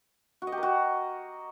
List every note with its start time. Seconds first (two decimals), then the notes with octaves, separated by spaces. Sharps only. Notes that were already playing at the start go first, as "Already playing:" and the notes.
0.42 F#4
0.47 D#5
0.52 G4
0.58 A#4
0.63 F#4